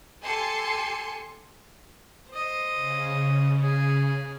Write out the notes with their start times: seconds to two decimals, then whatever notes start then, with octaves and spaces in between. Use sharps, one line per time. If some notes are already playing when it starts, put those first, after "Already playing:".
0.23 G4 A4 G#5 C6 C#7
2.30 C5 D#5
2.72 C#3
3.62 G#4